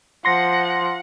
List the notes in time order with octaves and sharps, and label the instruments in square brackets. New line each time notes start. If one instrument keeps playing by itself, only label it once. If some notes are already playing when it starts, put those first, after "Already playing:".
[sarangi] F3 [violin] F#5 [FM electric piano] C6 A#6